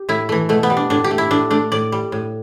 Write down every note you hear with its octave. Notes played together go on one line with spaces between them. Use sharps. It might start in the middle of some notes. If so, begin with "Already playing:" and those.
Already playing: G4
A2 E4
E3 A3
B2 A3
B3
G3
D4
A2 D4
G4
A3
E4
A2 D4
A3 D4
A2 D5
G3
A2